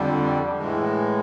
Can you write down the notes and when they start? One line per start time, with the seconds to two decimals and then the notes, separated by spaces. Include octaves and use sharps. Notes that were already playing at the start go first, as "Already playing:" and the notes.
Already playing: F2 D3 G3
0.59 A2 E3 G#3